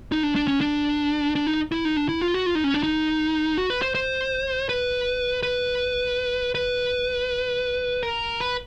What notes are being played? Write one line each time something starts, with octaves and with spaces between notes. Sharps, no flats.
D#4
D4
D4
C#4
D4
D4
D#4
E4
D#4
D4
E4
F4
F#4
F4
D#4
C#4
D4
D#4
F#4
B4
C5
C5
B4
B4
B4
A#4
B4